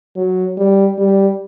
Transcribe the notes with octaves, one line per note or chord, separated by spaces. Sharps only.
F#3
G3
G3